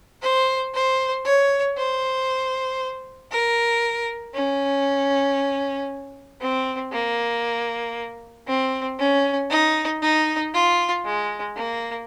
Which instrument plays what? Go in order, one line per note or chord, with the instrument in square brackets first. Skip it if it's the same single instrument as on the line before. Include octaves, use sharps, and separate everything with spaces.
[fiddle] C5
C5
C#5
C5
A#4
C#4
C4
A#3
C4
C#4
D#4
D#4
F4
G#3
A#3